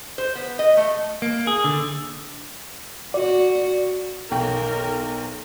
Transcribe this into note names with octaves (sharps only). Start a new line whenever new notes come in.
C5
B3
D#5
A3
A#3
G#4
D3
F#4 D5
B1 A#4 G5